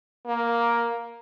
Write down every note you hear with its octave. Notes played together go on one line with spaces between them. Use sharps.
A#3